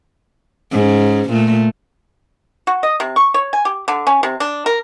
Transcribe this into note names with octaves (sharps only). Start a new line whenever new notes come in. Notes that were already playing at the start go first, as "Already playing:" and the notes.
G#2 C#4
A#2 A3
F#4
D#5
C3
C#6
C#5
G#5
G4
D3
C#4
C3
D4
A#4